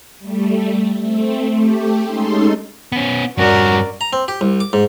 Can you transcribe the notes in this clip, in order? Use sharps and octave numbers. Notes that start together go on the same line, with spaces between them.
G3 A3
A3 C4
A3 G4
G#3 C#4 D#4 A4 C6
B3 C#4
G2 C#4 F#4 A#4 D5
A#5
C4
G4
C2
D6
G#2